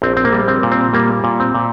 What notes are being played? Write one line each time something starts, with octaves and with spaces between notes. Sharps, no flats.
A#1 C4
C4
A#3
G3
C4
A#2
C4
G3 A#3
A#2
C4
A#2